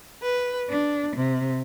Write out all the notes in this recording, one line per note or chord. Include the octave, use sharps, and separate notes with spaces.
B4
D4
C3